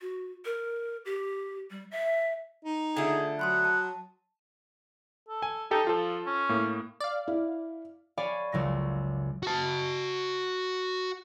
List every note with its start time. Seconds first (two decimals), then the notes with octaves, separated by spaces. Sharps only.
0.01 F#4
0.45 A#4
1.05 G4
1.71 G3
1.91 E5
2.65 D#4
2.97 D3 A3 D4 F4 G#4 A4
3.39 F#3 F#5 B5 C6 D#6
3.65 A5
5.28 A4
5.42 G#5
5.71 D#4 G4 A4
5.87 F3 F4 A4
6.26 C#4
6.49 A2 A#3
7.00 D5 F5
7.28 E4
8.17 C#5 D5 F5 G#5 B5 D6
8.52 F#1 C#2 C#3 F#3 A#6
9.43 F#4 A5